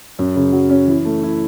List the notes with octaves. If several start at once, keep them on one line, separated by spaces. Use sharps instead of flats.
F#2
C#3
F#3
C#4
E3
A3
E4